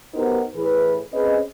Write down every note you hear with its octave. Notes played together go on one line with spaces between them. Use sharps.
B3 D#4 F#4 G4 A#4 C5
A2 E3 G#4 B4
C4 C#4 G#4 B4 D#5